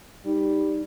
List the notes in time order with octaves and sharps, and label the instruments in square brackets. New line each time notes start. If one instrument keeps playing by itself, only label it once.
[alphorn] G3 [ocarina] D#4